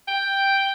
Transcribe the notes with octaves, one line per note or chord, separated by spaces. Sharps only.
G5